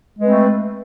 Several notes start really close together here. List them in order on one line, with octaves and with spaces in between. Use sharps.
G#3 B4 C4 A3